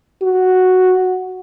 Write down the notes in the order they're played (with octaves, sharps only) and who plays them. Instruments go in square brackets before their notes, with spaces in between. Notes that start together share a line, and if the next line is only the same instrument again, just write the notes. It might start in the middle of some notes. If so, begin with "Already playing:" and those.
[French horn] F#4